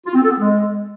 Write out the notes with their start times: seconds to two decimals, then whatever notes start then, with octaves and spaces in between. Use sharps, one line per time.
0.06 F4
0.14 C4
0.23 A4
0.31 B3
0.39 G#3